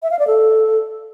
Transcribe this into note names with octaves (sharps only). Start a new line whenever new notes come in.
E5
F5
D5
A4